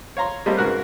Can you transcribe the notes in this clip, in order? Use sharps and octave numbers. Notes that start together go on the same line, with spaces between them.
C#5 F5 A#5 C6
G3 A3 A#3 C4 D#5
G#2 C#3 F#4 A#4 B4 F#6